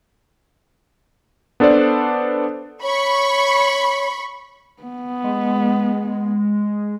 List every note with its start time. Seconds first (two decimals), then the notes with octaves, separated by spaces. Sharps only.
1.60 B3 D4 A4 C5 D5
2.82 C#5 B5 C#6
4.82 B3
5.24 G#3